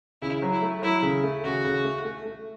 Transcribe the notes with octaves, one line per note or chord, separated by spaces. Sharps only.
C#3 E4
F#3
E4
A3
F#3 E4
C#3
A3
C#3 F#4
C#3
A3
A3
A3